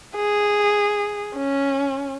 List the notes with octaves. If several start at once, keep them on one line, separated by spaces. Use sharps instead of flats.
G#4
C#4